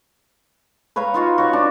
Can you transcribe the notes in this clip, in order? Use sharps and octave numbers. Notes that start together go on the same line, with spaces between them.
B4 C#5 F5 A#5
D#4 F4 F#4
F#4 C#5
D4